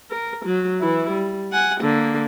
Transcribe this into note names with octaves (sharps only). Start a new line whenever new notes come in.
A#4
F#3
E3 E4
G3
F#5 G#5
D3 A#3